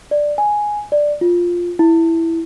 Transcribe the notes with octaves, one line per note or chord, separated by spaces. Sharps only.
D5
G#5
D5
F4
E4